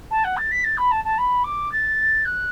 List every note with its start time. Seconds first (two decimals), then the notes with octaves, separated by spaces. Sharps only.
0.10 A5
0.24 F#5
0.37 A6
0.51 B6
0.64 A6
0.77 B5
0.91 A5
1.04 A5
1.18 B5
1.44 D6
1.71 A6
2.25 F#6